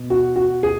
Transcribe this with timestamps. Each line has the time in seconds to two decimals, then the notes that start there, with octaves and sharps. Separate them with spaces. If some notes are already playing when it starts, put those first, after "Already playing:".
Already playing: B2
0.10 F#4
0.36 F#4
0.63 G#4